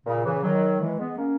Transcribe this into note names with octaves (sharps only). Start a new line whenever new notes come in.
A#2 C#3
C#3 E3
D#3 F#3
E3 G#3
G#3 B3
A#3 C#4